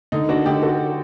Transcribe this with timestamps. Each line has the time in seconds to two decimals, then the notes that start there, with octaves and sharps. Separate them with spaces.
0.12 D3 D#4
0.29 D4 F#4
0.46 D3 D#4 G4
0.62 F#4 A4